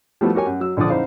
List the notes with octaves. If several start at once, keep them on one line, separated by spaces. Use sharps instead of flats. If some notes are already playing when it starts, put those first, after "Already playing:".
F3 G3 A3 B3 E4 F#4
F#4 G4 A#4 C#5 G#5
F#2
F#3 E6
A#1 D3 F3 D5 D#6
F#2 D#4 E4 C5 F5